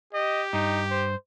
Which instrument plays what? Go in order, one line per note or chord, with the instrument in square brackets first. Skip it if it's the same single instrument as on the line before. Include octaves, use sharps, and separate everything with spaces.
[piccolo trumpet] G4 [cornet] D#5
[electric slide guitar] G2 [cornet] D#4
[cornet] C5